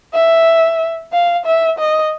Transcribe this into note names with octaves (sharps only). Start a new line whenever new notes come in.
E5
F5
E5
D#5